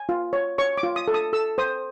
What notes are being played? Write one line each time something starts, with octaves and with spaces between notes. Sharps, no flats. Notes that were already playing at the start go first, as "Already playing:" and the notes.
Already playing: G#5
F4
C#5
C#5 C#6
D6
F4
D#6
A4
D#6
A4 E6
C5 D#6